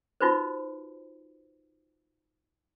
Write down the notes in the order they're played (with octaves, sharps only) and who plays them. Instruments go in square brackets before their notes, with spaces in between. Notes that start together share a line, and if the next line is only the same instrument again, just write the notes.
[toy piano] D#4 F4 F#4 B4 C5